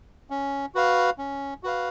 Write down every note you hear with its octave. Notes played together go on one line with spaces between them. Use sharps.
C#4
F#4 B4 F5
C#4
F#4 B4 F5